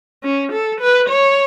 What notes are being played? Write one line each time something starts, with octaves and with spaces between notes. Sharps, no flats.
C#4
A4
B4
C#5